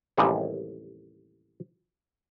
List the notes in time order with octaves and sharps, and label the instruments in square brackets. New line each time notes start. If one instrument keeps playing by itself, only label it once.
[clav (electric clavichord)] A1 D#2 C3 G3 G#3 A#3